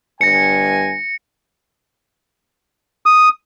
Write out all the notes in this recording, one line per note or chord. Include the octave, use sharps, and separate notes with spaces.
G1 G2 G#5 A#6 C#7
D#6